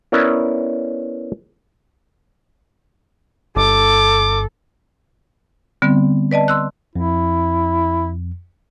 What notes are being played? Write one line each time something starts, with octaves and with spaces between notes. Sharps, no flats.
B3 C#4 E4 A#4 D5
G1 A4 D6
D3 G3 B3 C4
B4 D5 D#5 A5
C6 E6 F#6
F2 E4